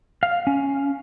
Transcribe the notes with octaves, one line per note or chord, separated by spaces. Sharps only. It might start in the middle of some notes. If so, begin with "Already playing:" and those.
F5
C#4